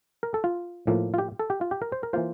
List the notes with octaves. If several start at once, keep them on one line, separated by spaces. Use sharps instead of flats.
A#4
A4
F4
A2 F3 A#3 F4
F4
G4
A4
G4
F4
G4
A#4
C5
A#4
E3 A#3 F4 C5